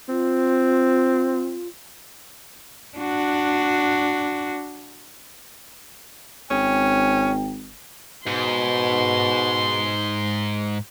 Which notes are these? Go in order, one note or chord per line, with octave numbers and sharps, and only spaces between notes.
C4 F4
D4 F#4
G#1 C#4 G5
G#2 B2 C6